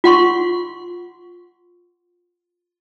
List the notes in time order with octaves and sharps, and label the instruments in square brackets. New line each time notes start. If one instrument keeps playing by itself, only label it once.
[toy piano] F4 F#5 C6 C#6